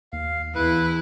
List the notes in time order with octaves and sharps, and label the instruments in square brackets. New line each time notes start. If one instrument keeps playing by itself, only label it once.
[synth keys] D#2 [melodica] F5
[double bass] E2 [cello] E4 [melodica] B4